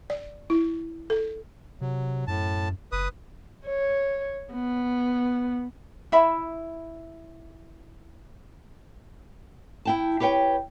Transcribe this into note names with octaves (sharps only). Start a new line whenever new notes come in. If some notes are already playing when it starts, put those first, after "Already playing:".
D5
E4
A4
C3 F#3
F#2 A2 A5
F#1 B4 D#6
C#5
B3
E4 E5 B5
E4 G5 A5
G4 B4 C#5 F5 G5